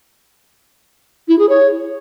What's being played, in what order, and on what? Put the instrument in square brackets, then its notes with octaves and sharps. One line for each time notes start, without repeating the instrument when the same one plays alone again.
[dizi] E4
G#4
C#5